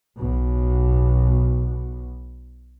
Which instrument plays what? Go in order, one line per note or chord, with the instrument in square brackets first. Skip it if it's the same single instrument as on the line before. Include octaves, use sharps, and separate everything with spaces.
[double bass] B1 B2